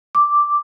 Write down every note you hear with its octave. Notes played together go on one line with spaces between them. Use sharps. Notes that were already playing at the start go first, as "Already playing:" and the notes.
D6